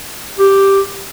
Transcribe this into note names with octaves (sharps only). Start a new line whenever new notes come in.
G4